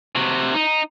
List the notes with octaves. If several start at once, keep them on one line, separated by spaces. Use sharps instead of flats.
C3 F#4
D#4